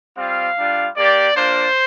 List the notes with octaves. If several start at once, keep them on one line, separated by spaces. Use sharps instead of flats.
G3 C4 F4 F5
G3 D4 F4
A#3 G4 D5
A#3 D4 F4 C5